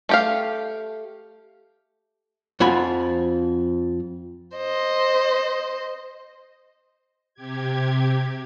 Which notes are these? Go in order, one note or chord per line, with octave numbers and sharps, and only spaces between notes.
A3 G4 F5
F2 F3 F#4 G#5 B5
C5 D#5
C3 G4 G#6